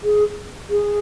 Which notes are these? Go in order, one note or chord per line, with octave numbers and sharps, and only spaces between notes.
G#4
G#4